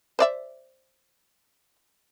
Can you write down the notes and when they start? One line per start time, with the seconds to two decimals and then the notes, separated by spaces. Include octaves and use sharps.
0.19 C5 D5 E5